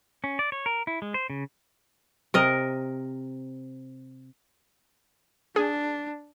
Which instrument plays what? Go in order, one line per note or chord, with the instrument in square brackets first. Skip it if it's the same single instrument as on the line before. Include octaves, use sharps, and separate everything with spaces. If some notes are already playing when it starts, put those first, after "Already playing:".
[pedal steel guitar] C#4
D5
C#5
A#4
E4
G#3
C5
C#3
[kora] C3 A#4 D#5
[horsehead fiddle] D4 [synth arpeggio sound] G#4